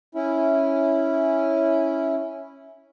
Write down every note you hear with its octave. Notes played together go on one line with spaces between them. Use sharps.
C#4 E4